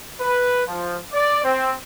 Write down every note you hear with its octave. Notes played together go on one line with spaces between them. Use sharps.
B4
F3
D5
C4